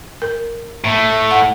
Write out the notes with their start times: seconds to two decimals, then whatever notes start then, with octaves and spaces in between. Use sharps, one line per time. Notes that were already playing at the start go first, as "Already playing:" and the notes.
0.22 A#4
0.84 A2 A3
1.31 F#5